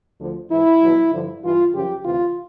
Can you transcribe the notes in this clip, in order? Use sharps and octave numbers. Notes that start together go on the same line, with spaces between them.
D2 D3 F3
G#2 E3 E4
E2 B2 F#3
G2 D3 F3
G2 E3 F4
F#2 C#3 F3 G4
D2 C3 E3 F4